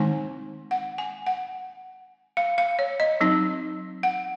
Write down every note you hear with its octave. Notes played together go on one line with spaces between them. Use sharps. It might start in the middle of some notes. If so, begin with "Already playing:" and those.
Already playing: D#3 G#3 C4 D#4 G#5
F#5
G#5
F#5
F5
F5
C#5
D#5
F#3 C4 D#4
F#5